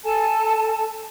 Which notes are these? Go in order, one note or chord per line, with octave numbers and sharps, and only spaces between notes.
A4 G#5 A5